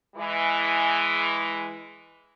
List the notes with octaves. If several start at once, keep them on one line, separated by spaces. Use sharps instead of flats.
E3 G#3